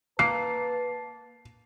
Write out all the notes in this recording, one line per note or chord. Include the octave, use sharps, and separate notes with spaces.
A#3 B4 A5 C7